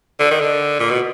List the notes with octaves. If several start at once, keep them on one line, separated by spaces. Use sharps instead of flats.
D3
D#3
D3
A#2
B2